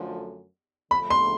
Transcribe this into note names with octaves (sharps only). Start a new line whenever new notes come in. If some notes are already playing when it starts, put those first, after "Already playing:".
Already playing: F#2 D3 F3 A3
D3 F3 A3 B5
C6